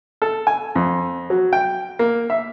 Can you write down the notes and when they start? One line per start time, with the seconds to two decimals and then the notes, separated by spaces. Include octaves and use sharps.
0.22 A4
0.47 G#5
0.76 F2
1.30 F#3
1.53 G5
1.99 A#3
2.30 E5